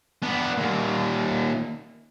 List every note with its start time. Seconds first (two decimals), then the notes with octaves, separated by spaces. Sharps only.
0.23 B3 D4
0.58 D#2 A#2